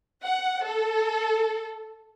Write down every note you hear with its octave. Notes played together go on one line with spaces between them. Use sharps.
F#5
A4